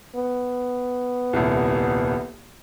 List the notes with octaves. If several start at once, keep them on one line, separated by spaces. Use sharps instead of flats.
B3
D#1 C2